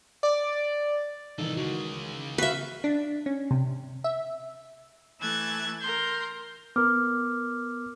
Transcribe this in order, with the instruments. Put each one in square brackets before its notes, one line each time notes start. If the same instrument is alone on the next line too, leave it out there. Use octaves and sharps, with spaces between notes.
[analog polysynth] D5
[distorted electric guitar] C2 A4 [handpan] D#3 E3 D#4
[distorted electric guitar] C#3 G#3 [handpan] F#4
[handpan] F#4 F5 [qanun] B4 E5
[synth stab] D4
C#4
C3
E5
[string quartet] E3 A3 E6 F#6 G#6 A6
A#4 C6 G6
[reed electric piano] B3 A#4 [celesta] D6 F6